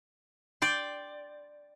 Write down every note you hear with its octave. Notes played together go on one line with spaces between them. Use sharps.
D5 G5 C6